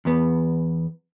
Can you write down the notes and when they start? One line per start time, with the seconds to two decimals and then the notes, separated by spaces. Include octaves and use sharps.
0.05 E2 B3